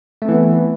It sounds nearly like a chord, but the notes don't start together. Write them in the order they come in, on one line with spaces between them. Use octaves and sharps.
A3 C4 E3 B3